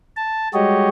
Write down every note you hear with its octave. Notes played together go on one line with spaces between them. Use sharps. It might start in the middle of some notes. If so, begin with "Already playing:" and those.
A5
G3 G#3 F#4 G4 C#5 D#5